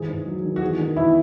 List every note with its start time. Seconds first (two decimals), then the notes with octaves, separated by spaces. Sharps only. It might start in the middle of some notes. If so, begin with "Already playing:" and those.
Already playing: G#1 E3 G#4
0.08 G#2
0.26 F#3
0.44 D#3
0.56 F#4
0.61 E2 G#4
0.79 D#3
0.96 E2 E4